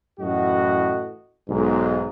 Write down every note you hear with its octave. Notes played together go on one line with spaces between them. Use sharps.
F#2 A2 E3 F#4 D#5
B1 G#2